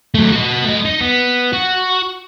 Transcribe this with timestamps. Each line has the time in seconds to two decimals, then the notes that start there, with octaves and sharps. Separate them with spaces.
0.15 F#3 A3
0.32 F#4 D#5
0.64 A3 D#5
0.85 D#4
1.00 B3
1.53 F#4